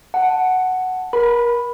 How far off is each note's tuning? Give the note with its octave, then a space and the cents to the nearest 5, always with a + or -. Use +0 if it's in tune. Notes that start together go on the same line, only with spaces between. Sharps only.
F#5 +0 A5 +0
A#4 +30 B5 +0